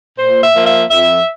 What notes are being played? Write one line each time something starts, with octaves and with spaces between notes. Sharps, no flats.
A#2 C5
E5
F3 A#3
E5
F2 E5